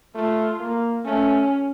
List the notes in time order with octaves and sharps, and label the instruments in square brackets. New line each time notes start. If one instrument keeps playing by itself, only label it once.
[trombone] A3 [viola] F4
[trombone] A#3
[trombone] A3 [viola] C#4